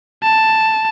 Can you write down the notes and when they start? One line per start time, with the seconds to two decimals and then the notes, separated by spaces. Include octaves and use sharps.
0.23 A5